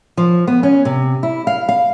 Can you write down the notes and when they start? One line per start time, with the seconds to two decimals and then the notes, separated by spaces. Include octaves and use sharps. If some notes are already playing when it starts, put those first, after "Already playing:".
0.17 F3
0.47 B3
0.63 C#4
0.85 C3
1.23 E4
1.47 F5
1.69 F5